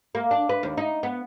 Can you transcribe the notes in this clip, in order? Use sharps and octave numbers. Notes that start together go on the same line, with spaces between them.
A#3
D4
B4
D#2
D#4
B3